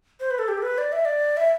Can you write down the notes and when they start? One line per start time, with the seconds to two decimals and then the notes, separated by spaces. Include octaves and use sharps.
0.20 C5
0.31 B4
0.39 A4
0.48 G4
0.58 A4
0.63 B4
0.78 D5
0.92 E5
1.05 D5
1.37 E5